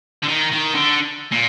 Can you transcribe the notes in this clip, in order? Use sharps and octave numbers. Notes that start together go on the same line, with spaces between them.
D3
D#3
D#3
D3
A#2